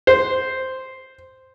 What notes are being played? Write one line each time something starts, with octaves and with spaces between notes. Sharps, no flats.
C5